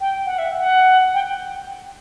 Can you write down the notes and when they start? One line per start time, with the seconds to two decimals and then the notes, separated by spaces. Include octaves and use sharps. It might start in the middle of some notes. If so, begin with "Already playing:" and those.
0.01 G5
0.26 F#5
0.39 E5
0.58 F#5
1.14 G5